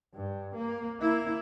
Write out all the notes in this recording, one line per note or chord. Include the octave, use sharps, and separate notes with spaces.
G2
A#3
A#3 E4